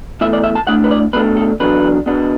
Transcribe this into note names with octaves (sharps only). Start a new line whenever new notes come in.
E2 E3 A3 E5
D5
E5
A5
A2 A3 D4 F#5
B4
D5
B2 A3 D4 B4
A4
E2 D3 F#3 D4 B4
B2 B3 D4